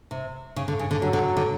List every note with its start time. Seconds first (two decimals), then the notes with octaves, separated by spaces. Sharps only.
0.11 C3
0.56 C#3
0.68 D3
0.79 C#3
0.91 D3
1.02 D3 F#3
1.13 D3
1.37 D3